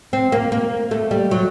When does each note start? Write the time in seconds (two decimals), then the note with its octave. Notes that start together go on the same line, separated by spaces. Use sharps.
0.13 C4
0.32 A#3
0.52 A#3
0.91 A3
1.11 G3
1.31 F#3